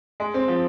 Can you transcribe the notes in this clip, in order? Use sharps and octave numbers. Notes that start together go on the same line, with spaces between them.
G#3
C4
F3